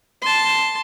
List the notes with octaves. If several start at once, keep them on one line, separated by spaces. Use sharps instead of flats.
A5 C6